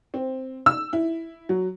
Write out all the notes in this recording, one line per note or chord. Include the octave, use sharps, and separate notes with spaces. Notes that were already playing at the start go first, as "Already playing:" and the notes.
C4
E6
E4
F#3